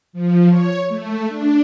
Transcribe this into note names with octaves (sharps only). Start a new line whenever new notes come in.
F3
C#5
A3
D4